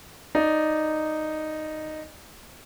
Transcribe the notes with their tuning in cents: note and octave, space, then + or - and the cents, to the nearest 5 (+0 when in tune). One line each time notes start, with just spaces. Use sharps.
D#4 -5 D5 +0